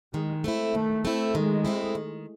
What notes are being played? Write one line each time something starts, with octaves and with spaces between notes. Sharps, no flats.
D#3 G#3
A3 C4 E4
D#3 A3
A3 C4 E4
D#3 G#3
A3 C4 E4
D#3